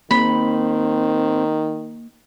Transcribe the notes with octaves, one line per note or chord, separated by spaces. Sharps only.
D#3 A#3 C4 B5